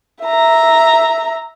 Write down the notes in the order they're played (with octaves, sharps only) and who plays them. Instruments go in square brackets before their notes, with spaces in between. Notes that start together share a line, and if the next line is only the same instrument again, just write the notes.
[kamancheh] E5 A#5